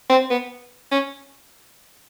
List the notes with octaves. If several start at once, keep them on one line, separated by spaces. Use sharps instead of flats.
C4
B3
C#4